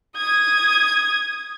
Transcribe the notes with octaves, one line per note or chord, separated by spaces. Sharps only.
D#6 G#6